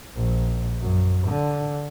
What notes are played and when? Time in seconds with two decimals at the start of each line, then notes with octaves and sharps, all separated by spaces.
0.15 A#1
0.81 F#2
1.28 D3